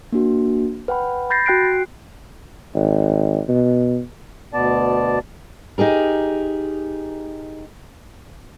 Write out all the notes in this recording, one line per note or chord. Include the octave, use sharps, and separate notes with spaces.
A#3 D4 F#4
B4 F#5 G5 B5
B5 G6 A6 A#6 C7
F#4 G5 F#6 C7 D7
G#1
B2
D2 B2 B3 D5 A5
D#4 G4 G#4 A#4